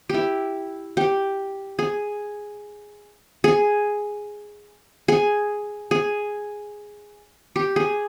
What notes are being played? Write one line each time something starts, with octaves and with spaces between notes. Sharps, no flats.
E4 G4
G4
G#4
G#4
G#4
G#4
G4
G#4